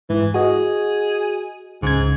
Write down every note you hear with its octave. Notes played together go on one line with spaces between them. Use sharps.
G#2 E3
F#4 G#4 D#5
C#2 G#2 C#3 G#6